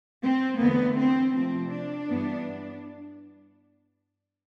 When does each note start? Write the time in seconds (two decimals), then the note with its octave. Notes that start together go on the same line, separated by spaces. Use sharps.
0.23 C4
0.59 E2 D3 A3 B3
0.97 C4
1.34 C3 F3 A3 C4
1.72 D4
2.10 G2 E3 G3 B3